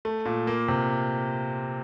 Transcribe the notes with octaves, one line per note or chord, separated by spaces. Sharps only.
A3
A#2
A#3
C3